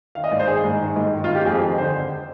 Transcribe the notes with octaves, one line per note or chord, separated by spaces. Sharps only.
D#3 F5
D#5
G#2 D5
C5
D#3 G#4
G#2
D#3
G#2
D#3
F4
G#2
G4
F2 G#4
D#3
D3 C5